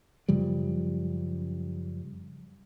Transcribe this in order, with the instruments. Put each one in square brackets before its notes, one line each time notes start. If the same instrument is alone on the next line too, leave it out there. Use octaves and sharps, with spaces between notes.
[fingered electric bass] F#2 C#3 F3 G3